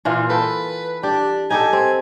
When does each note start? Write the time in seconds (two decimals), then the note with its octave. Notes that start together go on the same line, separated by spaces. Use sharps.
0.05 A#2 E3 F4
0.30 A4 B4 G5
1.03 D4 G4
1.50 D#4 G4 A4 G#5
1.73 C4